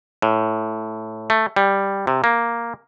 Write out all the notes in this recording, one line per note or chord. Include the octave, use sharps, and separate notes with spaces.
A2
A3
G3
C3
A#3